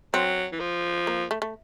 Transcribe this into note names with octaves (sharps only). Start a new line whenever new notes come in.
F#3 C4
E3
F3
A#3
A3
A3